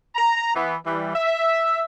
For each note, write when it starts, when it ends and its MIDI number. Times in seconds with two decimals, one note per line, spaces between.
0.15 0.55 82
0.55 0.75 52
0.55 0.75 59
0.85 1.14 52
0.85 1.14 55
1.14 1.83 76